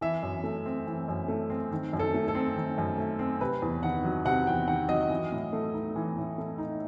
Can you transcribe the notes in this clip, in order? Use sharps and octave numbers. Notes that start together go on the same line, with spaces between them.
E3 E5
F#2
A3
C4
E3
F#2
A3
C4
D#3
F#2
A4
A3
A4
C4
D#3
F#2
A3
C4
C3 B4
E2
D#3 F#5
F#3
C3 F#5
E2 G5
D#3 F#5
F#3 D#5
E3
A2
A3
D#4
E3
A2
A3
D#4